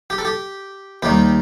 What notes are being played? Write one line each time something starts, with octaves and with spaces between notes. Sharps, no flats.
G4
A4
G4
D#2 D#3 G3 D#4 G4